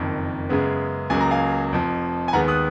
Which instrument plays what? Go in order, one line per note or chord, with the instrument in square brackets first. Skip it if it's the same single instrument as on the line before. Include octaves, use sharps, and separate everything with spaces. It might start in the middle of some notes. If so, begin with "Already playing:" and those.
Already playing: [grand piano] F#1 F2 D#3
F#2 C#3 G#3 B3
C#2 C#3 F#3 A#3 G#5
A#5
F5 G#5
F1 F2 F3
G#5
D#2 D#3 G#3 B3 F#5 A#5
D#6 F#6